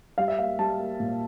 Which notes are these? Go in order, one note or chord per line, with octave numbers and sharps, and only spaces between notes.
G3 F5
E5
A#3 F5
G3 A5
A#3
A#2